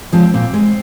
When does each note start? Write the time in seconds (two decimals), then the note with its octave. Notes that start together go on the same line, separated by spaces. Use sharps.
0.13 F3 G#3 C4
0.34 A#2 C4
0.54 G#3